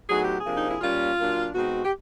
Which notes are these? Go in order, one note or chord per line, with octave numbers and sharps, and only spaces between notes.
A2 F#3 B3 D#4 G#4
G4
G#4
C3 F3 A#3 D4
D#4
E4
A#2 G3 A#3 C#4 F4
A#2 F#3 A#3 D4
B2 G#3 C4 D#4 F#4
G4